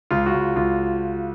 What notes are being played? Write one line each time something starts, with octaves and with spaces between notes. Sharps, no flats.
C#2 F4
F#4
C#2
C#2 F4